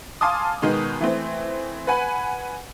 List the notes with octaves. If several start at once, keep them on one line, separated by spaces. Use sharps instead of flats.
F5 G#5 A5 C6 D6 D#6
B2 D#3 G#3 B3 D#4
E3 A3 C4
B4 F#5 G#5 B5